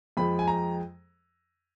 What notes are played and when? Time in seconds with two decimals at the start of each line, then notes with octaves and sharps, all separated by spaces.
0.17 F2 F3 G#3 B5
0.39 G#5
0.48 A#5